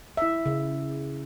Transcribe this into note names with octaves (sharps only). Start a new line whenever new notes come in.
E4 E5
C#3